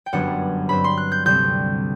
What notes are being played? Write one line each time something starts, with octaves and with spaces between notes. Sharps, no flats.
G5
G1 F#2 F#3 B3 D4 F#5
G2 F#3 C4 B5
C6
F#6
G6
D2 C3 G3 C4 G6